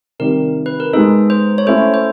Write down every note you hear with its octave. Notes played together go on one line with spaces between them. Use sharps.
C3 D#3 G3 A#4
B4
A#4
G#3 B3 D#4 A4
C5
C#5
A3 C#4 E4 C5
C5